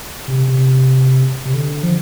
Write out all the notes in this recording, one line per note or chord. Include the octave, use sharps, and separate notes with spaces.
C3
C3
C3
D3
F3